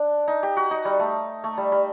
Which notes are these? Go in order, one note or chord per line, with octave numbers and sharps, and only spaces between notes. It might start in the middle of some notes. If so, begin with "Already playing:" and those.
Already playing: D4
D#4
G4
F#4
D#4
G3
A3
A3
G3
G3